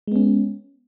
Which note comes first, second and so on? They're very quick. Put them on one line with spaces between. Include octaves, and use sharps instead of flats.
G#3 B3 C#4